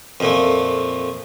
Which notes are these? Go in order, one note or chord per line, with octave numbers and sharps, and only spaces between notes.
F2 A#2 A3